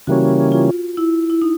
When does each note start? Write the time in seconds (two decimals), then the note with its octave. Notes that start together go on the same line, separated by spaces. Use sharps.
0.07 C#3 E3 G3 A#3 C#4 F#4
0.52 F4
0.97 E4
1.30 E4
1.42 D#4